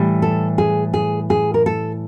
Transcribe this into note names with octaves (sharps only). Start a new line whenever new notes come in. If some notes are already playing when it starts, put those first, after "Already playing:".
Already playing: A2 E3 G3
A4
G#4
G#4
G#4
A#4
A4